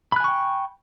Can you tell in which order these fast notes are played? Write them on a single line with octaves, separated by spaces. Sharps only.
B5 F#6 G#5 C#6 G5